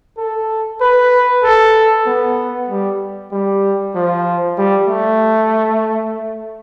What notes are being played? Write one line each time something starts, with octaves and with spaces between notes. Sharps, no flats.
A4
B4
A4
B3
G3
G3
F3
G3
A3